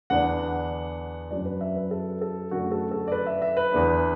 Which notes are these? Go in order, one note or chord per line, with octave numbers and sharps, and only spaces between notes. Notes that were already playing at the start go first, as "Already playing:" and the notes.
E2 D3 B3 D4 F#5
F#2 F#3 D4 D5
B4
E5
B4
A4
A4
F#2 D3 A3 D4 F#4
A4
A4
D5
B4
E5
E5
B4
E2 D3 B3 D4